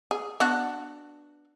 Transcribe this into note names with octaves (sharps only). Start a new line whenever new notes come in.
G#4
B3 D4 F#4